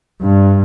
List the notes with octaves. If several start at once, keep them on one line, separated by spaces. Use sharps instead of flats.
G2